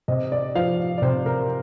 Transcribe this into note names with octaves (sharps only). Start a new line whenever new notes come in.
C3 D#5
D5
F3 F5
D5
C3 C5
A#4